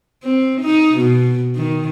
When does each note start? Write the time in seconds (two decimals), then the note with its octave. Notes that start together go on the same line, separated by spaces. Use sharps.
0.24 C4
0.61 D#4
0.97 B2
1.56 D#3